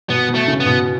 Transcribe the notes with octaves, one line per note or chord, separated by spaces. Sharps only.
B2 B3
B2
A3
C#3
B3
B2